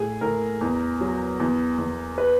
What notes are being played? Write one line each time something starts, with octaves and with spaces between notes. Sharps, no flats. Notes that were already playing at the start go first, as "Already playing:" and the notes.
Already playing: A2 G#4
A2 A#4
E2
F#3
E2
E2
B4